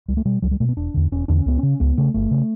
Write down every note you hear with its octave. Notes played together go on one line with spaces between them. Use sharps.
C#2 G3
A3
B2 G3
C#2 F#3
G3
B2 A3
B3
E1 D4
E2 D3
E1 C#4
E2 D3 D4
C#4
C#2 B3
C#4
C#3
C#2 B3
C#3 A3
G1 A3
C#3